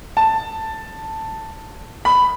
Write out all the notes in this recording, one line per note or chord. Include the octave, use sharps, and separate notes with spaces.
A5
B5